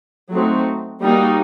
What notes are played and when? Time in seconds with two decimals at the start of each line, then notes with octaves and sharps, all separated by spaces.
0.30 F#3 A3 C4 D#4 F#4
1.01 G3 A#3 D#4 F#4